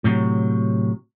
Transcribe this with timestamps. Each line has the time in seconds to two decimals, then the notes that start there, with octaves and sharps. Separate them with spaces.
0.04 A2 C3 F#3